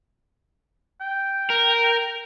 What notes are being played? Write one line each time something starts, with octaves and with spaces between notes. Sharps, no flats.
G5
A#4